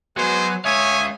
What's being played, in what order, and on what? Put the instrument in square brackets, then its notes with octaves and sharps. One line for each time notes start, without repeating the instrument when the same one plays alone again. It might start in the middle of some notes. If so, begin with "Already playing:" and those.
[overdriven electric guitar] F#3 [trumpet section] G#3 C5 [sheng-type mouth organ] B3 G#5
[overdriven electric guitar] G#3 F5 [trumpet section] C#5 G#5 [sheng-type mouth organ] E5 D#6